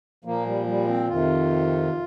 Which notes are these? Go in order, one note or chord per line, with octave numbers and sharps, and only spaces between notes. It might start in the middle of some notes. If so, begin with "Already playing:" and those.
A#2 F3 A#3
G3
G3
C4
F2 C3 D#3 F4